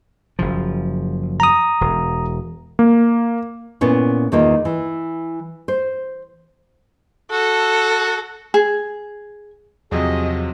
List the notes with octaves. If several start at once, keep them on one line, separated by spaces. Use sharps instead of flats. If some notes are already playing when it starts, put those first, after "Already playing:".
F#1 C#3 F3
A#5 D#6
E1
A#3
A#2 B3 C#4 E4
E2 D#3 A#3 F4
E3
C5
F#4 A4
G#4
E2 C3 F3 F#3 G#4 D#5